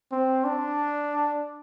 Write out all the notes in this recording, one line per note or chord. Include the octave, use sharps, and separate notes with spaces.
C4
D4